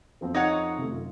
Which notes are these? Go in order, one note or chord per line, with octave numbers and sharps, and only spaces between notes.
F2 F3 C4
D#4 C#5 F#5
C3 A3
F#2 F4